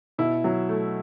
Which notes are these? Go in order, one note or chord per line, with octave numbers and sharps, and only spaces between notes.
B2 E4
F#3
A3